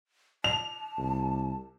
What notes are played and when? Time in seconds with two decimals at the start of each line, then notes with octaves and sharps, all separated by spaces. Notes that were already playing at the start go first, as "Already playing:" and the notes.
0.44 A5 F7
0.98 C2